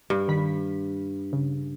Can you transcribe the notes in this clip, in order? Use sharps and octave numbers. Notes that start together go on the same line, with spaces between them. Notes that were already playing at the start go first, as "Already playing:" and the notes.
G2
D#3 B5 B6
C#3